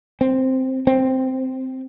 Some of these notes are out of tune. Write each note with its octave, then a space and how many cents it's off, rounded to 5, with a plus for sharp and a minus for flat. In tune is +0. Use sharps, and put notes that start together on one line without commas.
C4 +0
C4 -5